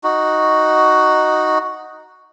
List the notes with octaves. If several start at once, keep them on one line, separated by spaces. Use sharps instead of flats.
D#4 F#4